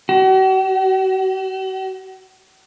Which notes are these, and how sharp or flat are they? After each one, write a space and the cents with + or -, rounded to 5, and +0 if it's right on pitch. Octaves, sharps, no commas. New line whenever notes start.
F#4 +45